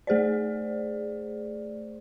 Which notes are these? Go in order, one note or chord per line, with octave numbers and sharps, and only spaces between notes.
A3 G#4 C5 D5